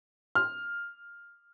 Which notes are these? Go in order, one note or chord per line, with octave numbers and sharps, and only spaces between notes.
F6